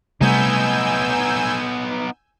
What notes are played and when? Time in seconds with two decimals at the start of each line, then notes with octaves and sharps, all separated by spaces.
0.21 C3 G3 A3 B3 D#4 G#5 E6 G6